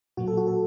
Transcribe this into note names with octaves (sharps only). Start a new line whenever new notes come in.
A#2 F#3 A#3 F#4
A4
F#4
A4